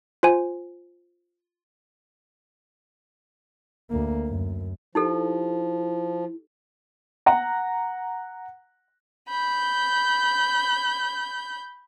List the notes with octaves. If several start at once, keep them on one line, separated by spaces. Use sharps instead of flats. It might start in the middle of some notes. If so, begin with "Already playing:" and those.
F4 C5 G#5
D2 A#3
F#2
F3 D#4 E4 G4 A4
F#5 A#5
B5 G6